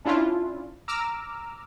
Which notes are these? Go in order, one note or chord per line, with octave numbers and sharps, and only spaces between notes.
C#4 D4 E4 F4
A#5 D6 E6 F6